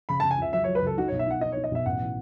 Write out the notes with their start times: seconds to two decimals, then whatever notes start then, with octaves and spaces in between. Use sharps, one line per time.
0.09 C#3 B5
0.20 A5
0.23 C#3
0.31 G#5
0.38 C#2 E5
0.53 F#3 E5
0.64 C#5
0.67 F#3
0.75 B4
0.82 C#2 A4
0.97 D#4 F#4
1.08 C#5
1.12 B1
1.19 E5
1.27 D#4 F#5
1.41 D#4 D#5
1.52 C#5
1.56 D#4
1.64 D#5
1.71 B1 E5
1.86 A1 F#5
2.00 E3